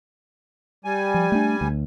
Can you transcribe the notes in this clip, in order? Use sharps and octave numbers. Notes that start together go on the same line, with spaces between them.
G3 G#5
F3
A3 D4
D2